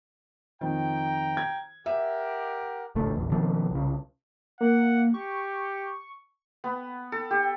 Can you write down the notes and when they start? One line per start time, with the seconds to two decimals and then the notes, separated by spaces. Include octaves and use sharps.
0.61 F2 D#3 G5 A#5
1.37 G#6
1.86 G4 A#4 E5 F#5
2.95 D1 G#1 C#2 A3
3.16 A#1 E2
3.31 B2 D#3 F3 C4
3.70 C2 C#3
4.61 A#3 F#5
5.14 G4 C#6
6.64 B3
7.12 A4
7.31 G4